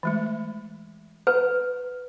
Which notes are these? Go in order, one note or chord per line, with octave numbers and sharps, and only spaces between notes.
E3 G#3 A3
B4